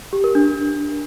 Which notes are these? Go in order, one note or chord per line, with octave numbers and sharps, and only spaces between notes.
G4
A#4
D4